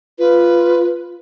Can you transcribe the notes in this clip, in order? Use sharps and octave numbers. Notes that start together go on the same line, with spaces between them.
F4 B4